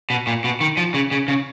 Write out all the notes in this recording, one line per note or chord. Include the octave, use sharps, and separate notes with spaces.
B2
A#2
B2
D#3
F3
C#3
C#3
C#3